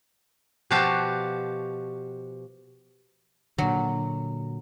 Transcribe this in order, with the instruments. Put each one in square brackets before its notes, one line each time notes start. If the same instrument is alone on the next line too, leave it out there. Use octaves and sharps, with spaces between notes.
[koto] B2 F3 F#4 G4 F5 A5
[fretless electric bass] A#2 D3 [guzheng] F#3